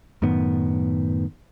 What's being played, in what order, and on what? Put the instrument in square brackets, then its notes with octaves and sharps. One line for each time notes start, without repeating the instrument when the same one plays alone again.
[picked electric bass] F#2 A2 D#3 B3